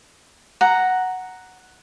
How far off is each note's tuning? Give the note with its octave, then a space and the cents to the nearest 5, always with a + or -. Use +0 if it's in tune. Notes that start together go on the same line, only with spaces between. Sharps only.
F#5 +0 A#5 +0